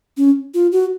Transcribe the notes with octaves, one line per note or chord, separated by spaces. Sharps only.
C#4
F4
F#4